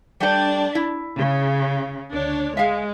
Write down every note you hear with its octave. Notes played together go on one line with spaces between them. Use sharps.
G3 A3 D4 G5
E4
C#3
D2 D4 C#5
G#3 E5 F5